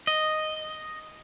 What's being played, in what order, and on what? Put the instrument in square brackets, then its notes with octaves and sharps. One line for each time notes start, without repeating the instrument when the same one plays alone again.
[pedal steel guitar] D#5